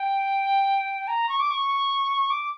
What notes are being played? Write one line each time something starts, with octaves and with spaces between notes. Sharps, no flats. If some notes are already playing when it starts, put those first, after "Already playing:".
Already playing: G5
A#5
C#6
D6
C#6
D6